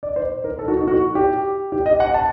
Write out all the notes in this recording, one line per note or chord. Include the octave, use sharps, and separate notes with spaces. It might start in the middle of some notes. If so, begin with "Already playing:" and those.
D5
C5
A#4
A4
F#4
D#4
F#4
G4
G4
D#5
F#5
A5